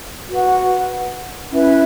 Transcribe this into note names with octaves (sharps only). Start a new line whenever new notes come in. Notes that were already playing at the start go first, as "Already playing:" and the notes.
F#4 B4 F#5
C#4 E4 B4 E5